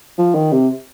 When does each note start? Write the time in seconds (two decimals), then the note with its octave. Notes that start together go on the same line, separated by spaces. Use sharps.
0.18 F3
0.35 D#3
0.52 C3